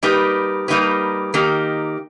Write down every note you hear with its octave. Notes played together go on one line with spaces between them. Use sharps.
G3 A#3 D#4 G4 B4
G3 A#3 D#4 G4 B4
D#3 A#3 D#4 G4